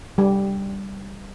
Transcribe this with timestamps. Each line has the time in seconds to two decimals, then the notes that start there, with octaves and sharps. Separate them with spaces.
0.18 G3